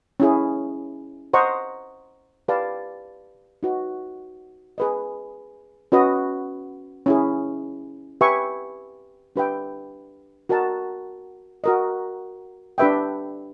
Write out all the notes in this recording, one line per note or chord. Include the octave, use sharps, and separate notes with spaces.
C#4 E4 G#4
C5 D#5 F#5 A#5 C#6
G4 B4 D5 F5 A5
D#4 F#4 B4
G#4 B4 D#5
C#4 F#4 B4 D#5
C#4 E4 G#4
G4 B4 E5 G#5 C#6
D4 G4 B4 E5 G5
F#4 A#4 D#5 F#5 A5
F#4 A#4 D#5
D4 G4 B4 E5 G5